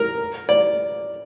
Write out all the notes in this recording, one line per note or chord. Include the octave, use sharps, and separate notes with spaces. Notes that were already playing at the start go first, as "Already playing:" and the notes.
Already playing: A#4
D5